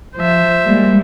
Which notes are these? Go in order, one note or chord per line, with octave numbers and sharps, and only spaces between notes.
F3 C5 E5
G3 G#3 A#3